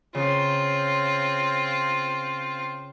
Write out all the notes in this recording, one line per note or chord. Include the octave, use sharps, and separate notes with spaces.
C#3 C4 F4